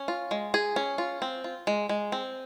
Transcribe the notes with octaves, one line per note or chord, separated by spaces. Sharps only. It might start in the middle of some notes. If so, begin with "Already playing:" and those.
Already playing: C#4
F4
G#3
G#4
C#4
F4
C4
F4
G#3
G#3
C4